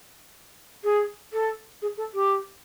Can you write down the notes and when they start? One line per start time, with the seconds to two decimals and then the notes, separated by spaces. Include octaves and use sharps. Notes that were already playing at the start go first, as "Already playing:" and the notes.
0.84 G#4
1.32 A4
1.81 G#4
1.97 A4
2.14 G4